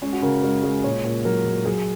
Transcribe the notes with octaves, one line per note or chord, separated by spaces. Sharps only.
G#3 C#4
F#4
C#3 A#4
G#3 A#4
G#3 G#4
A#2 C#5
A#2
F#3 A#4
F#3
F#3 G#4